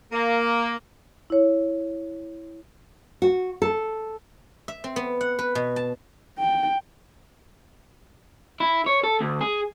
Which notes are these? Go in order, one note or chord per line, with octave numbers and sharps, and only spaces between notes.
A#3
E4 C#5
F#4
A4
E5
C4
B3
F#5
B4
B2
A5
G5
E4
C#5
A4
D2
G#4